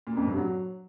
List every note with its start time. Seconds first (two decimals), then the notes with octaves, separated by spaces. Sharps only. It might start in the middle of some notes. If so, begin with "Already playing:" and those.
0.07 A#2
0.17 F2
0.27 G2
0.37 F#3